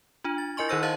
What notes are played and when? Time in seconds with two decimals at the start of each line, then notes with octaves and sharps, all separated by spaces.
0.24 D4 F4
0.38 A6
0.57 E4 A#4 D#5 G#5 C6 C#6
0.68 D#3 D#4 C5 E6 A#6
0.83 C5 D#5 F5 A5 A6